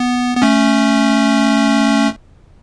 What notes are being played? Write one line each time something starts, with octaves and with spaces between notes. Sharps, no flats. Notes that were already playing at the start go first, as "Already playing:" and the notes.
Already playing: B3
B3
A3 C#4